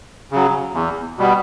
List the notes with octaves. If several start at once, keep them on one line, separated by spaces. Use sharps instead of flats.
C#3 F#3
E2
B2 G3 B3